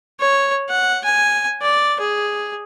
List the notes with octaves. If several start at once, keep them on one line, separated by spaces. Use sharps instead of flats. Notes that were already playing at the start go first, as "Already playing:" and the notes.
C#5
F#5
G#5
D5
G#4